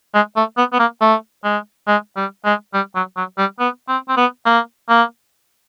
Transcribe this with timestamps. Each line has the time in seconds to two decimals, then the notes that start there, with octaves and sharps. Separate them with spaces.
0.14 G#3
0.36 A3
0.57 B3
0.73 B3
0.79 A#3
1.01 A3
1.44 G#3
1.87 G#3
2.16 G3
2.45 G#3
2.74 G3
2.95 F#3
3.16 F#3
3.38 G3
3.59 B3
3.88 C4
4.09 C4
4.17 B3
4.46 A#3
4.89 A#3